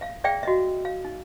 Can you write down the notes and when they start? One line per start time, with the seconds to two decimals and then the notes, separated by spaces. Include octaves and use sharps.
0.01 E5 F5
0.24 G#4 D5 E5 F5 G5
0.43 F#4 D#5 E5
0.85 F5
1.05 D#4